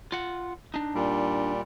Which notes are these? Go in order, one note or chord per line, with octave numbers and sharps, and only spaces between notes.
F4 F#5
D4 D#4
A#2 G3